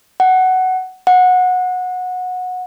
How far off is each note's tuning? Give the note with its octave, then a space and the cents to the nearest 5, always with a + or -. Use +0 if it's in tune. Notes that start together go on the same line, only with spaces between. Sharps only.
F#5 +10
F#5 -20